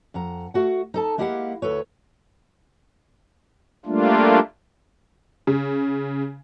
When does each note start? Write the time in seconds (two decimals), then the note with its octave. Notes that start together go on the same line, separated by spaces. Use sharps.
0.14 F2 F#5 A#5
0.54 A3 F#4 F#5
0.94 D#4 A4 A5
1.18 G#3 A#3 E4 G4 F5 F#5
1.62 D2 A4 B4 C#5
3.86 G3 A3 A#3 D4 F4
5.47 C#3